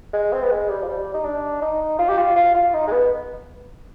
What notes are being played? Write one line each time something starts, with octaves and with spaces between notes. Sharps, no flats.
G#3
C4
B3
G#3
G3
F3
G3
D#4
D4
D#4
F4
G4
F4
F4
F4
D#4
G#3
B3